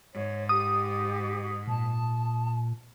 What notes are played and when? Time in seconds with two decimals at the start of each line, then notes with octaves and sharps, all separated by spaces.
0.13 G#2 C#5
0.49 G4 D#6
1.67 A#2 A5